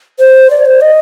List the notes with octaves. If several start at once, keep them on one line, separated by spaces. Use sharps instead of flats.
C5
D5
C5
D#5